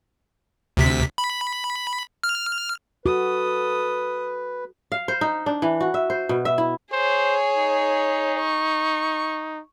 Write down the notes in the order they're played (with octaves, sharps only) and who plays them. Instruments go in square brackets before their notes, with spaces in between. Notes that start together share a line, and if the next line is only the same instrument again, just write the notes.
[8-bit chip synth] D2 C3 B6
B5
F6
[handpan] F#4 [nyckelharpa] A4 D#6 [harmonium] B4
[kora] F5
C5
D#4
D4
E3
F#4
E5
C5
B2
E5
E4
[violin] G#4 C#5 [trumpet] C5
[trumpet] D#4
[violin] C#6